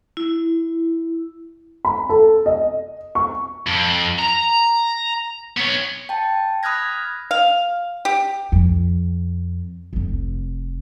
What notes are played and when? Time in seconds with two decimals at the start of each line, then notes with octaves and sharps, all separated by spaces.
0.17 E4
1.85 B5
2.09 A4
2.46 D#5
3.15 C#6
3.67 F2
4.19 A#5
5.57 B3 C#5
6.09 G5 A5
6.63 B5 D#6 F6 F#6 G#6 A#6
7.31 F5
8.05 G4
8.52 F2
9.93 F1 C4